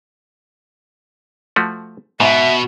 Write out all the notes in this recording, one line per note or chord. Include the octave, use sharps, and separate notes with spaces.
F3 A3 F#4
G#2 B2 E5